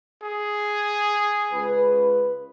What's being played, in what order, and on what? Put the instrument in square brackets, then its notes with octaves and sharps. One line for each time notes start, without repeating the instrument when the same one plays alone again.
[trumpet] G#4
[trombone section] C#2 B4